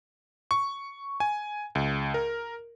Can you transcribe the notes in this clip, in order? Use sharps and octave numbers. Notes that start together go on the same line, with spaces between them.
C#6
G#5
C#2
A#4